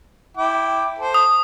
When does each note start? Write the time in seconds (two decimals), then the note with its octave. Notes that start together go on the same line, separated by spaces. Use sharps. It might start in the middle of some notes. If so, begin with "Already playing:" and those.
0.37 E4 G5 D6
0.99 A4 C5
1.14 D#6